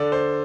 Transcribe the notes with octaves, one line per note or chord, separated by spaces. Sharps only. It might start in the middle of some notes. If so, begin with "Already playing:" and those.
Already playing: D3 D5
C5